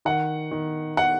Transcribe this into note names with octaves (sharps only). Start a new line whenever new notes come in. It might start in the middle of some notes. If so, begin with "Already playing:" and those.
D#3 F#5
D#3
F#5